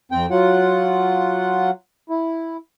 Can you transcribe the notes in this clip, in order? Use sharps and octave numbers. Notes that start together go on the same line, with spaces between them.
F2 C4 G5
F#3 F4 F#5
E4